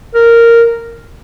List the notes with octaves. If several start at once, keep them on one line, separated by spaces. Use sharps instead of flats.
A#4